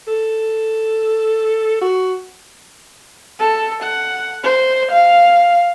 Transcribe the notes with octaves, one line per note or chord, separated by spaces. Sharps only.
A4
F#4
A4
F#5
C5
F5